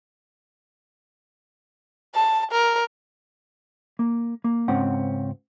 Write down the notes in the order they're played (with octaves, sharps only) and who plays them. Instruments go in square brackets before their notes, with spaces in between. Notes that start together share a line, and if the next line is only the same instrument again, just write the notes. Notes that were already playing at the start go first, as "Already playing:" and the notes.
[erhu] A5
A#4
[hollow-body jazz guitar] A#3
A#3
C#2 G#2 C4 C#4 F#5